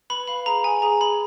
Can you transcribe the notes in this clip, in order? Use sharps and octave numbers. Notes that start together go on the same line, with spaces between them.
B4 B5
F5 B5
G#4 A#5
G#4 G#5
G#4 A#5
G#4 B5